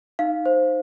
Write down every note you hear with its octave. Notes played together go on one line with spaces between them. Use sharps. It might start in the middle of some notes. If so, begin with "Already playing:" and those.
D#4 F5
C5